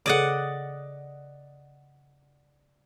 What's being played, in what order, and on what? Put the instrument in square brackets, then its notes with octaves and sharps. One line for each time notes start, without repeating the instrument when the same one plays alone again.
[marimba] C#3 G#4 A4 [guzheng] D5 D#5 F#5